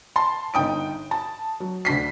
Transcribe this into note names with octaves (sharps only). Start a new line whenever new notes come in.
A5 C6
G1 D#4 G5 D#6 D7
A5
F#3
D2 D4 B6 C7